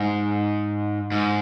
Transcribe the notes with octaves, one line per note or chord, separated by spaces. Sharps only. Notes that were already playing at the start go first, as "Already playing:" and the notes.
Already playing: G#2
G#2